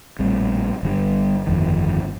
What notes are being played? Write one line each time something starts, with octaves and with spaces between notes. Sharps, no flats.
A#1 A2 G3 C4
G1 G2 D3 G3
G1 F2 D#3